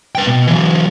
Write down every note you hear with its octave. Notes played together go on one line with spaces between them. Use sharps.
B4 G5
B2
E3 F#3